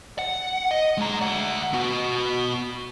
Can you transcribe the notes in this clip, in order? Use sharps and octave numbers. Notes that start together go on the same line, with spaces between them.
F#5
D#5
G#3 A#5
D2 F#5
B3 F#4